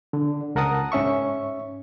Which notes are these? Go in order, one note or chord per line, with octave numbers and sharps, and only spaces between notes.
D3
C#2 A#4 F#5 A5 D#6
G#2 C#4 E5 C#6